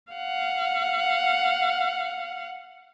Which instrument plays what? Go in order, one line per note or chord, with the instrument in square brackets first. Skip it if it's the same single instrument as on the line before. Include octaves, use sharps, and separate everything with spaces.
[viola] F5 F#5